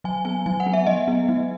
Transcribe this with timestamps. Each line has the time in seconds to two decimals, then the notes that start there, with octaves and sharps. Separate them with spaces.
0.04 F#3 G#5
0.25 B3 G#5
0.46 F#3 G#5
0.60 F#5
0.66 B3
0.73 E5
0.87 F#3 D#5
1.08 B3
1.29 F#3